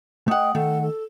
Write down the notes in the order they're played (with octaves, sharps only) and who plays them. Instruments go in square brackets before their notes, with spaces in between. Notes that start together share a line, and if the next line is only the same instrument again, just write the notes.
[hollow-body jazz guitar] A3 F#5 [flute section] D#5 G5 D#6
[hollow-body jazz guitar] D#3 A3 [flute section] A4 F#5
[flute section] A4